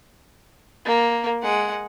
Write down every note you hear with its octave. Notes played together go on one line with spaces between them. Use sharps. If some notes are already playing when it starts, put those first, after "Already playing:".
A#3
G#3 F#5